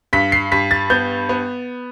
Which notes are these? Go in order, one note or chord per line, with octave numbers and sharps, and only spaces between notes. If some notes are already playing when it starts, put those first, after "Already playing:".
G2 B6
C7
G2 B6
A6
B3 G6
B3